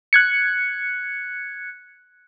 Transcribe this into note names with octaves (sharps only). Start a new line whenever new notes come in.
F#6 G#6 C#7